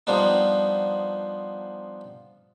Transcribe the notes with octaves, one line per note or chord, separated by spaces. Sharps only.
F3 G3 B3 D4 D#4